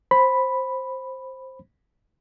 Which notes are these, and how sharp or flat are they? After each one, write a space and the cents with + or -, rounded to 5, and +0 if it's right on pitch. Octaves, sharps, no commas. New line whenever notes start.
C5 +10 B5 +0